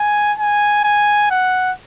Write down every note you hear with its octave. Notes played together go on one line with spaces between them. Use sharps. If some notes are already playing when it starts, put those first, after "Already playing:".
Already playing: G#5
G#5
G#5
F#5